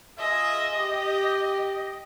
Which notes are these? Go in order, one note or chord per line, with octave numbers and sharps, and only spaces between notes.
F4 G#4 D#5 E5
G4